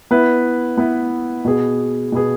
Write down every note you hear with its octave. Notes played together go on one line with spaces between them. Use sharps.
B3 E4 B4
B3 E4 B4
B2 B3 G#4
B2 B3 G#4